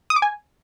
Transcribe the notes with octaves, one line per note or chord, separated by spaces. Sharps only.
D#6
D6
G#5